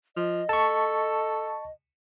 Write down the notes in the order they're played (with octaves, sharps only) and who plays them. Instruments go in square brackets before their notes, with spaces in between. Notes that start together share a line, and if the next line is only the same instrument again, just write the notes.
[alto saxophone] F3 [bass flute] D#5
[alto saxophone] A4 [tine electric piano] A5 C#6